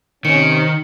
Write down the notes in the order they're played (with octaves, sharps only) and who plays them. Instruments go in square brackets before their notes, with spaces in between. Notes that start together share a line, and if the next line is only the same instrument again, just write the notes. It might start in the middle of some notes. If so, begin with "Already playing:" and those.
[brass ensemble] C3 C4 C#4 [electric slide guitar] D#3 [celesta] C#7